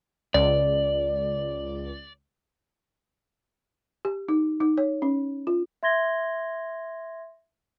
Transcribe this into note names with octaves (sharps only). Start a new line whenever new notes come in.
C#2 D5
G4
D#4
D#4
C#5
C#4
F4
E5 C6 G#6 A#6 G7